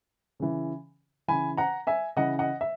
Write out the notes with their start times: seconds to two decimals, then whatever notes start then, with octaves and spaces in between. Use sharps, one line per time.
0.40 C#3 E3
1.28 C#3 E3 G#5 B5
1.57 F#5 A#5
1.87 E5 G#5
2.16 C#3 E3 D#5 F#5
2.39 D#5 F#5
2.61 E5